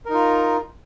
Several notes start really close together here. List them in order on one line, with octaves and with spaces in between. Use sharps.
A#4 D#4 F4